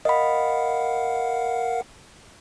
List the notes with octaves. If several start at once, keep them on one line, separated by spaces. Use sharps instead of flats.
A#4 D#5 F5 F#5 B5